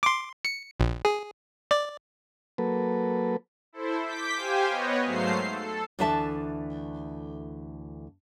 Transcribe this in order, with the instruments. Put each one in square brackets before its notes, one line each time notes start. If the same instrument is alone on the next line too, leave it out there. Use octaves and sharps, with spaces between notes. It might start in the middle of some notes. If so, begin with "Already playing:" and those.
[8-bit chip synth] C6 D6
C#7
A#1
G#4
D5
[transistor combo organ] F#3 A#3 A4 B4
[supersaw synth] E4 A4 C5
D6 G6 B6
G4 C5 F5 G5 G#5
B3 B4 C#5 D#5
G#2 F#3 A3 C5 F5 C7
A4
[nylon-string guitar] D2 E3 D4 A4 E5 A5